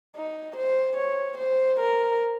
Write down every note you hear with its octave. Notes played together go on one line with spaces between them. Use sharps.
D#4
C5
C#5
C5
A#4